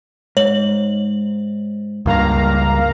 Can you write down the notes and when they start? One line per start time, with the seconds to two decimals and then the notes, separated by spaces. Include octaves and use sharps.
0.37 G#2 C#5 F#7
2.06 C#2 G2 A#3 F5 A#5